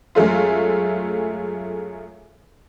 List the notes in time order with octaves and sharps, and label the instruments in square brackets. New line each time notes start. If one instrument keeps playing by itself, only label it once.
[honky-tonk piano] F#2 G#3 A3 F4